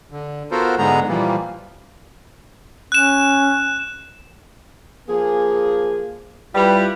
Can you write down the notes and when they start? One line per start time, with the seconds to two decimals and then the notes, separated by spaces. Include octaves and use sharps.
0.11 D3
0.51 B3 F4 F#4 A4 A#4 C5
0.78 G#2 D3 G#3 B3 A#5
1.08 A#2 E3 F3 G3 A#3
2.92 C#4 F#6 E7
5.09 F3 A#3 G#4
6.55 G3 E4 F4 B4